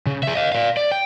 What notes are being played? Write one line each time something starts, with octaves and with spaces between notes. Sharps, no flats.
C#3
G#4 E5
D#5 F5
D5 F5
D5
G5